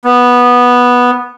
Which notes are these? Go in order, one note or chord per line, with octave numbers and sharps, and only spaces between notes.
B3